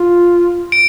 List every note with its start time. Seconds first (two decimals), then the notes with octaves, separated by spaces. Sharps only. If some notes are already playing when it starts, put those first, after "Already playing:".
Already playing: F4
0.72 D7